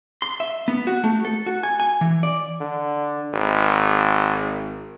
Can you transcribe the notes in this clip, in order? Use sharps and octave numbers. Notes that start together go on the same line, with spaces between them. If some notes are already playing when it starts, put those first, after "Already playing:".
C6
E5
B3
F#4
A3
A4
F#4
G#5
G#5
E3
D5
D3
G#1